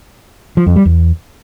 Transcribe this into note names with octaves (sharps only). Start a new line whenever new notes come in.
F3
F2
G3
E2